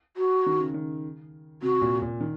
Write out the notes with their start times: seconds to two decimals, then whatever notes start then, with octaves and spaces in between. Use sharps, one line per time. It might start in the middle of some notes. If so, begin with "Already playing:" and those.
0.17 F#4
0.46 D#3
0.59 C#3
0.74 D#3
1.62 C3 F#4
1.81 A#2
2.02 A#2
2.20 D#3